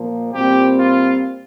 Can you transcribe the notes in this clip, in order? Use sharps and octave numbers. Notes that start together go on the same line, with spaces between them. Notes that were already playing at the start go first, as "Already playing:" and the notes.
Already playing: A#2 F3 A#3
A#2 G3 C4 G4
F4